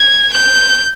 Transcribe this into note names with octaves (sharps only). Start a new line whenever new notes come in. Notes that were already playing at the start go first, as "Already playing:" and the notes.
Already playing: G#6
G6